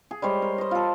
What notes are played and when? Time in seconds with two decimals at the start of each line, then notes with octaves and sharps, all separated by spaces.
0.11 G#4
0.22 G3 G#3 C5 C#5
0.42 A#4
0.58 C5 D#5
0.71 F4 A4